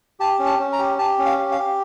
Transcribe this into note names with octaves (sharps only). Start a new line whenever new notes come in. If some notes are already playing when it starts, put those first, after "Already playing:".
G4 A5
C#4
A5
C#4
A#5
G4
G4 A5
C#4
F5
G4
F5
G4